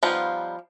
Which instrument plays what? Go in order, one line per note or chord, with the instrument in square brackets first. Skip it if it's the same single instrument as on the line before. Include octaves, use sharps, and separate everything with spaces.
[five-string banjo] F3 G3 B3 D#4 F4